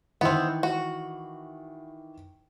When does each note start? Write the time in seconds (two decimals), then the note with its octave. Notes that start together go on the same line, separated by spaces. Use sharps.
0.21 D#3 E3 B3 C4
0.63 F#4